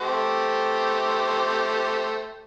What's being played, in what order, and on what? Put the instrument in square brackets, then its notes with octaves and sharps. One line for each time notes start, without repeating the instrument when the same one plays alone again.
[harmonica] A3 G4 C5